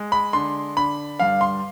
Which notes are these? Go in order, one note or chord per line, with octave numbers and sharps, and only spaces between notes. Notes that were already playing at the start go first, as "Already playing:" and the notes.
Already playing: G#3
B5
D3 C6
D3 B5
G2 F5
C6